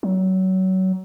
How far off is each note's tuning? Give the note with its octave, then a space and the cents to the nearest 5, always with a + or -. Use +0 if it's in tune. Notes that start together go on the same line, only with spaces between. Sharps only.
F#3 +25